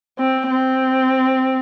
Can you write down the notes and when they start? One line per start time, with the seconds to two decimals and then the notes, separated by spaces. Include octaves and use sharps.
0.19 C4
0.51 C4